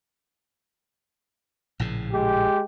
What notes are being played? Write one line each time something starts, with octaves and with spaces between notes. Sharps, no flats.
A#1 A2 C#3
G#3 G4